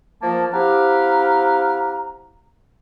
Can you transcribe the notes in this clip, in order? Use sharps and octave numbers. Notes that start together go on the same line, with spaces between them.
F3 A#3 A5
C4 E4 G4 F5 F#5 A#5